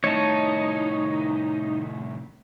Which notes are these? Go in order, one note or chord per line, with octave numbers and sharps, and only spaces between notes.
C2 A2 D#4 C#5 A5